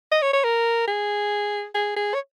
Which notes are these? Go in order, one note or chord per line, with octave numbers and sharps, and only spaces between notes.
D#5
C#5
C#5
A#4
G#4
G#4
G#4
C#5